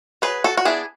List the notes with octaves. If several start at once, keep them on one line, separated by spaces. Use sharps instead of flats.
F#3 G#4 B4
F#4 A4
F#4
B3 D4 E4 G#4